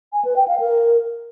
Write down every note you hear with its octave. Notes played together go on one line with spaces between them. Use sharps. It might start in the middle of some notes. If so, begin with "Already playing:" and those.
G#5
B4
G5
F5
A#4